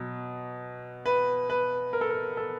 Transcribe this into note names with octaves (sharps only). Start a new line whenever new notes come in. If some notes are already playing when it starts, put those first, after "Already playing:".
Already playing: B2 F#3
B4
B4
A#4
A4
A#4
A4